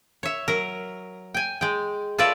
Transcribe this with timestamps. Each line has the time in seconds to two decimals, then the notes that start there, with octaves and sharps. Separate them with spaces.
0.23 C#5 E5
0.48 F#3 A#4
1.34 G5 G#5
1.61 G#3 G5
2.18 F4 A4 B4 C#5 D5 E5